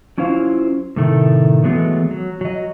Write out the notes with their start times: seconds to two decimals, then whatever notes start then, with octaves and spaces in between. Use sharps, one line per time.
0.18 F#3 C#4 E4 F4 C5 F5
0.96 A2 C3 D#3 A3
1.64 E3 F#3 G#3 A3 B3
2.11 F#3
2.41 F#3 D#5